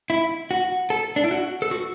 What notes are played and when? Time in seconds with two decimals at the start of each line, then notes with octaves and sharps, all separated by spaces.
0.10 E4
0.51 F#4
0.90 A4
1.16 D4
1.24 E4
1.31 F#4
1.62 A4
1.71 F#4